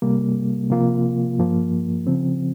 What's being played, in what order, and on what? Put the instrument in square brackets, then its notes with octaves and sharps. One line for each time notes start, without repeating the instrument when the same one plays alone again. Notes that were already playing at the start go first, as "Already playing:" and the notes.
[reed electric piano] C3 G3 A#3
C3 F3 A#3 F4
G2 F3 A#3
C#3 F3 C4